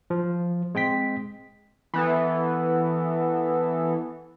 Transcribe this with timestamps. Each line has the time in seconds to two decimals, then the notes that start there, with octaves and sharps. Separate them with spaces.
0.10 F3
0.75 G#3 C4 G5 B6
1.94 E3 B3 A4